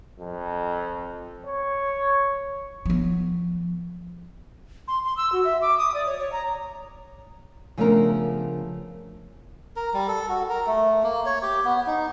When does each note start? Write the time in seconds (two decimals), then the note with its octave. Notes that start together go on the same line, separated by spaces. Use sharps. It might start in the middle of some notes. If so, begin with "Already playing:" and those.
0.20 F2
1.47 C#5
2.86 F3 B3
4.88 C6
5.05 C6
5.17 E6
5.32 F#4
5.45 E5
5.61 D6
5.78 D#6
5.94 D5
6.06 C#5
6.19 C#5
6.32 A#5
7.77 C#3 F3 A3 B3 D4 A#4
9.76 A#4
9.94 G3
10.08 A4
10.29 F#4
10.49 A#4
10.67 A3
11.04 A#3
11.26 C#5
11.42 G4
11.65 B3
11.87 D#4